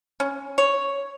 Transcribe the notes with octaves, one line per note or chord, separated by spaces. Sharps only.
C#4
C#5